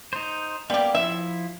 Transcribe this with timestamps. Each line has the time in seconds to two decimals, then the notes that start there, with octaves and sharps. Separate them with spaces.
0.13 D#4 C5
0.70 G3 A#3 B3 G4
0.95 F3 E4 E5